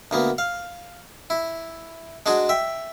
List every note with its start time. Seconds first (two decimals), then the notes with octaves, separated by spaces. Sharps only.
0.11 D2 A#3 B3
0.38 F5
1.30 E4
2.26 G#3 D4 F#4 G#4
2.49 E5 G5